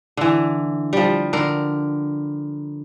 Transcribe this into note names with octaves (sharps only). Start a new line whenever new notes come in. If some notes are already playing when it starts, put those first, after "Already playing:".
D3 E3
F3 G3
D3 A#4